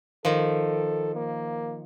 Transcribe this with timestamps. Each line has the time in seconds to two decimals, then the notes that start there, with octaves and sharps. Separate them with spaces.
0.25 D#3 F3 A4
1.15 A#3